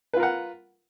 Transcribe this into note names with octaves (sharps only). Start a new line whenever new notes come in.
F4 A#4 B4 F#5